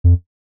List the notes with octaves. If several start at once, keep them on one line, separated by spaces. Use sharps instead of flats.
F2